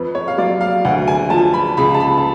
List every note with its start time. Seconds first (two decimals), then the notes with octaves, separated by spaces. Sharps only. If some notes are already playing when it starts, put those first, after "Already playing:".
Already playing: F2 B4
0.15 C#5
0.28 F5
0.38 F#3 D5
0.61 F5
0.85 D2 F#5
1.08 G#5
1.30 F3 A5
1.54 B5
1.77 C#2 B5
1.94 A5
2.00 B5
2.17 A5